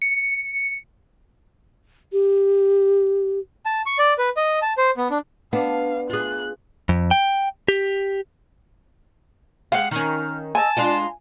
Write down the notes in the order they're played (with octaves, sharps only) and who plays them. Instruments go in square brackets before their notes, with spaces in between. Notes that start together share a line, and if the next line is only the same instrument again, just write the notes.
[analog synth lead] C#7
[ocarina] G4
[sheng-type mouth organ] A5
C#6
D5
B4
D#5
A5
C5
B3
D4
[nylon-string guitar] B3 [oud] D4 [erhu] F5
[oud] F4 G#4 [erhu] F#6
[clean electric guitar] F2
G5
G4
[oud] G#3 G4 [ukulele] F5 [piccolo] F#5
[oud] D#3 C#4 [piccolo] F6
[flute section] D#5 E6 [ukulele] G#5 [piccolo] A5
[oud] G#3 D4 F4 [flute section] A#5 C6